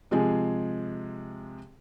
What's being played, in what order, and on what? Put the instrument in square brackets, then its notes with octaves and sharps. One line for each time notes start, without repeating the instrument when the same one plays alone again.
[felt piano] C3 F3 G#3 G#4